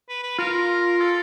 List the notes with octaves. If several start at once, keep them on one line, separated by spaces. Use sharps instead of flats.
B4
B4
F4 A#4
A4